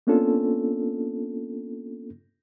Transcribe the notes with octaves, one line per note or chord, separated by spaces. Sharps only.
A#3 B3 C#4 D4 F4 A4